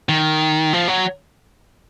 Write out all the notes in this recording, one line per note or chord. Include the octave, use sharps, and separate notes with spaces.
D#3
F3
F#3